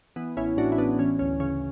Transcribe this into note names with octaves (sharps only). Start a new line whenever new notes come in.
E3 B3
A1 C#4 E4
A2 D4 F#4
E4
A1 B3 D4
E3 C#4
D2 C#4
C#3 C#4